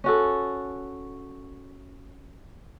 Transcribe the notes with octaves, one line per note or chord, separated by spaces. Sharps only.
C#4 F#4 A4